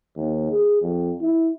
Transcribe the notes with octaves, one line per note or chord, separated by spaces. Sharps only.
D#2
G#4
F2
E4